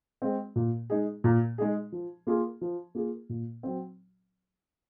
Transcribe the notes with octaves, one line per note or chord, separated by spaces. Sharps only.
G#3 C4
A#2
G#3 D#4 G#4
A#2
G#3 D#4 G#4
F3
A#3 F4 G#4
F3
A#3 F4 G#4
A#2
F#3 C4